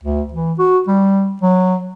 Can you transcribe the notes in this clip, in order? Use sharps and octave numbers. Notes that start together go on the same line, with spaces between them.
D2
E3
F#4
G3
F#3